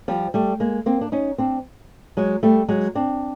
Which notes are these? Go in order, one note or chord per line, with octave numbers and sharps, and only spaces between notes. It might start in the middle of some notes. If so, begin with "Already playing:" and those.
F3 G3
G3 A3
G#3 A#3
A#3 C4
D4
C#4 D#4
C4 D4
F#3 G#3
G3 A3
F#3 G#3
C4 D4